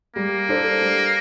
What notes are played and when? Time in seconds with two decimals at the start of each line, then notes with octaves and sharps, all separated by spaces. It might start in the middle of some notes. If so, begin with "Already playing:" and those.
0.16 G3 A#3
0.49 D4 A4 C5
0.81 G3